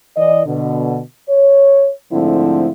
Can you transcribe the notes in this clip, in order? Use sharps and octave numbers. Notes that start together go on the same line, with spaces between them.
E3 D5 D#5
B2 D3
C#5
G#2 D3 F3 A3 C4 E4